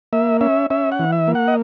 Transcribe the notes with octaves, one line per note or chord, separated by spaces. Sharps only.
A#3 E5
C#4 E5
C#4 E5
F#5
E3
E5
A#3
F#5
D#5